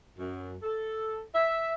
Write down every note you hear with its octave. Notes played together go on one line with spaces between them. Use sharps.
F#2
A4
E5